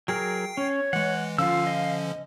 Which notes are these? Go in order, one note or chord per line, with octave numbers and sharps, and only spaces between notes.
F#3 G#4 A#4 G5 C7
C#4 C#5
E3 G#3 F#5
D3 F3 C#4 F4 F5 E6
D#5